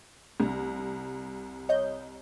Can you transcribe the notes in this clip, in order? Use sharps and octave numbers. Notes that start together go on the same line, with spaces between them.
C2
C#5 D#5 G6